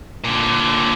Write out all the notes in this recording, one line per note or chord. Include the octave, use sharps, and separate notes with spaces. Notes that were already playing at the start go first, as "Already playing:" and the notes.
A#2 D3